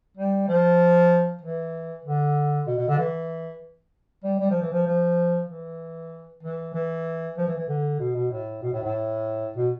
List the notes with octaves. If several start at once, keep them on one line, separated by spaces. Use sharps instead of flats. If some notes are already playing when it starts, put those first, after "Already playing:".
G3
F3
E3
D3
B2
B2
D3
E3
G3
G3
F3
E3
F3
F3
E3
E3
E3
F3
E3
E3
D3
B2
B2
A2
B2
A2
A2
B2